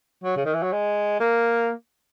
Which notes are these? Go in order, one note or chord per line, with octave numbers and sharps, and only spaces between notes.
F#3
C#3
D#3
E3
F#3
G#3
A#3